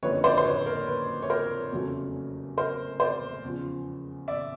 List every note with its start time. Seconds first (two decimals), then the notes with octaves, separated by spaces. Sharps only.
0.03 F#1 F2 D3 B4 C#5
0.24 C5 D5
0.38 C5
0.45 B4 C#5
0.66 A#4
0.87 B4
1.22 C#5
1.30 A#4 C5
1.72 F1 E2 C#3 F#3 A3
2.57 A#4 C5
3.00 C5 D5
3.43 E2 C#3 F3
4.28 D5 E5